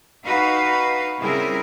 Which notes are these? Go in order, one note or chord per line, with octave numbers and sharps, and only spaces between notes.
D#4 F#4 B4 F5
C#3 G3 C4 E4 G#4 A#4